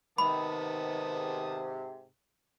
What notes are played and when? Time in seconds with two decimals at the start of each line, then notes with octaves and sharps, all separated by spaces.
0.18 G#2 C3 D#3 B3 A5 B5 D#6